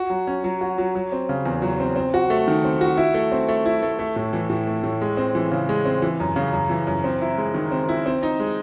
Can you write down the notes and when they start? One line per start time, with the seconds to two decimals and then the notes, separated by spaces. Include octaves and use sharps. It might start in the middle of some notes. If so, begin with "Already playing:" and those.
Already playing: F#4
0.10 F#3
0.27 C#4
0.44 F#3
0.61 F#4
0.78 F#3
0.95 F#3
1.12 C4
1.29 C#3
1.45 E2
1.62 F#3
1.80 C4
1.96 C4
2.14 F#4
2.30 A3
2.48 D#3
2.65 C4
2.81 F#4
2.97 E4
3.14 A3
3.32 C4
3.48 A3
3.66 E4
3.82 A3
3.99 A3
4.16 A2
4.33 E3
4.50 A2
4.67 A3
4.83 A2
5.02 G#3
5.17 C4
5.35 E3
5.51 C#3
5.69 G#3
5.85 C4
6.02 E3
6.20 F#2
6.36 C#3
6.53 F#2
6.70 E3
6.87 F#2
7.04 C4
7.21 E4
7.38 G#3
7.54 D#3
7.71 C4
7.89 E4
8.06 C4
8.23 D#4
8.40 G#3